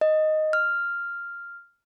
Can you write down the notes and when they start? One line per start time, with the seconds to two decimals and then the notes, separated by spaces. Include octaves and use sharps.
0.01 D#5
0.53 F6